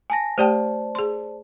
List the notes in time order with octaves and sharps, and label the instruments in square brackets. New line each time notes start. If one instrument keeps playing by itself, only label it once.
[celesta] G#5 A5 A#6
[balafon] A3 G4 G5 [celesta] C5 D5 A5
[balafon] G#4 C6